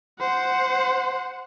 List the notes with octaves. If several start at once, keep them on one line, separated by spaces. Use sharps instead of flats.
C5 F#5